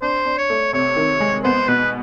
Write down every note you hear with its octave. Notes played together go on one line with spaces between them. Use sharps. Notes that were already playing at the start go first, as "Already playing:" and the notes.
D4 C5
D4
C#5
A3
C3 C#5
D#3
G#3
B3 C5
B2 B4